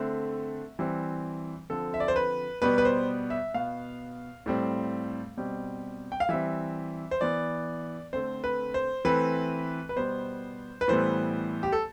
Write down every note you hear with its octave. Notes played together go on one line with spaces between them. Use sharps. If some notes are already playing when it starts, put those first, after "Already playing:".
Already playing: D3 A3 C4 E5
E3 G3 C4
D3 F3 C4 A4
E5
D5
C5
B4
B2 G3 B3 B4
B4
C5
E5
B2 B3 F5
A2 G3 C4
B2 G3 C4
G5
F5
E3 G3 C4 E5
C5
E3 B3 D5
D3 A3 C4 C5
B4
C5
E3 A3 C4 B4
B4
B2 G3 B3 C5
B4
A2 E3 G3 B3 C5
G4
A4